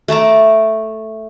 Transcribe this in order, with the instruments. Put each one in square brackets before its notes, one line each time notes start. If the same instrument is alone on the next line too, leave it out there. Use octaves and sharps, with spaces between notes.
[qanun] A3 A5 A#5 D6